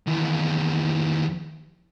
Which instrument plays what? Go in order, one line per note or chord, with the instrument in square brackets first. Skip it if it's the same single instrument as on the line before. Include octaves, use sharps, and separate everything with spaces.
[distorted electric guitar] D#2 E3